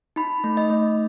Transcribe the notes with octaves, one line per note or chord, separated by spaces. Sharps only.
D#4 B5
A3
D#5
A3